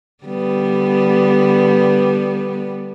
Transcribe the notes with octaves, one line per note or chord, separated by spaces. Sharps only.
D3 G3 B3